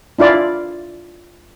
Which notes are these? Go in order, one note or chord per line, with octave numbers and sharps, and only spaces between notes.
D4 E4 F4 D5